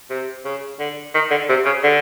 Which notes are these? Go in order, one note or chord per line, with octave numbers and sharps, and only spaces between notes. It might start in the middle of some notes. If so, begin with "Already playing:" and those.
C3
C#3
D3
D#3
D3
C3
C#3
D3